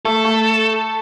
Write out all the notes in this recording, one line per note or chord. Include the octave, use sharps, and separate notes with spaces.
A3 A4
A3